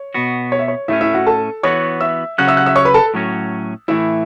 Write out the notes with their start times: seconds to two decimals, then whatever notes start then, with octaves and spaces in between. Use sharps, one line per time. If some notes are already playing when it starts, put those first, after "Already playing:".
Already playing: C#5
0.14 B2 B3 F#4
0.52 C#5
0.59 E5
0.68 C#5
0.88 A2 A3 C#4 E4 E5
1.01 E4 E5
1.13 F#4 F#5
1.27 A4 A5
1.63 E3 B3 F#4 C#5 C#6
2.01 E5 E6
2.38 C#3 F#3 C#4 F#4 F#5 F#6
2.48 E5 E6
2.57 F#5 F#6
2.66 E5 E6
2.76 C#5 C#6
2.85 B4 B5
2.94 A4 A5
3.14 A2 F#3 C#4 F#4
3.88 A2 E3 A3 E4 E5